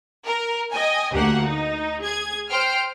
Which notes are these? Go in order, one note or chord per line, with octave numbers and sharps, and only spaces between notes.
A#4
D#5 G5 G#5
D2 A#3 G4 F#5
D#4
G#4 G#6
C5 G5 F6